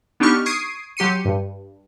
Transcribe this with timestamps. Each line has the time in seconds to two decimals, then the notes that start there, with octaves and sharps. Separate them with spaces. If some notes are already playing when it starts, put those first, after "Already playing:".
0.20 B3 D4 D#4 G4 C#6 F6
0.46 C#6 D#6 G#6 C7 D7 D#7
0.97 F#3 G4 C6 C#7 D#7
1.25 G2